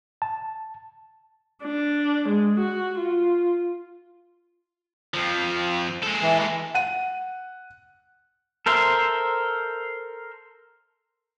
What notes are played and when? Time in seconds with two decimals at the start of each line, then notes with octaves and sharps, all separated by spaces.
0.22 A5
1.64 D4
2.29 G#3
2.60 F#4
2.99 F4
5.14 F2 F3
6.03 G#3 A4
6.21 E3
6.75 F#5 D#7
8.66 A4 A#4 C5 E5